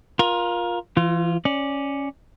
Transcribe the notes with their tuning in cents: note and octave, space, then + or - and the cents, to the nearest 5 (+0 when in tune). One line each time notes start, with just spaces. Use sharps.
F4 +10 A#4 +25
E3 +35 F4 +0
C#4 +0 D5 +0